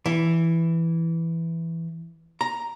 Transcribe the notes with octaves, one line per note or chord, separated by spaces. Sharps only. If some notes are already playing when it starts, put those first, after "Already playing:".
E3
A#5